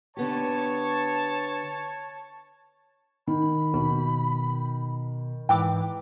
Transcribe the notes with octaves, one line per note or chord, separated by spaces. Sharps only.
D3 B3 G4 C#5 A5
D#3 B5
D#2 B2
G#2 E3 G5 D6